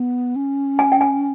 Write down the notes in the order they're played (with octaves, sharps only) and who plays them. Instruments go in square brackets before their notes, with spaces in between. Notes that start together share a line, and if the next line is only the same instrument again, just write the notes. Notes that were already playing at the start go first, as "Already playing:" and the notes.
Already playing: [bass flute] B3
C#4
[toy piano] G#5
G5
G#5